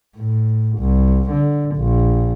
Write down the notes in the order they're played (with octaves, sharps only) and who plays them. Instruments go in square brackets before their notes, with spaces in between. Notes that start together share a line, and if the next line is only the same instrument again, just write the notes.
[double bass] A2
C2
D3
A#1